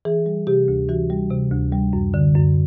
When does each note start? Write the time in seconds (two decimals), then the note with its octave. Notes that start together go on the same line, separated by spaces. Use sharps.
0.05 E3 G#4
0.26 G3
0.47 C3 G4
0.68 D2
0.89 E3 F#4
1.10 G3
1.30 C3
1.52 D2
1.72 G3
1.93 F#2
2.14 D3
2.35 F#2